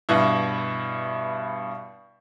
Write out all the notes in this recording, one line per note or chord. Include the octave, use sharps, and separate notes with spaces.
G2 B2 E4